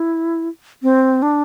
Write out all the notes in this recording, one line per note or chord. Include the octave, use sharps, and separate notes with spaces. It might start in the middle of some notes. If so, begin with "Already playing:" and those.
Already playing: E4
C4
D4